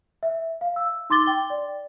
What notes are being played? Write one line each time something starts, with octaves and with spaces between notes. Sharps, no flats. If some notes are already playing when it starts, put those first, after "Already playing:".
E5
F5
E6
D#4 C6 D6 A6 G7
G5
D5